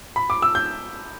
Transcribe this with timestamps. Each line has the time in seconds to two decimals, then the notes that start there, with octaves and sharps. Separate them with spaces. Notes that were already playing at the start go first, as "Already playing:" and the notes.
0.16 B5
0.30 D6
0.42 E6
0.55 G6